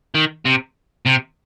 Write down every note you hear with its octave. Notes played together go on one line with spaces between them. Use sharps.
D#3
C3
C3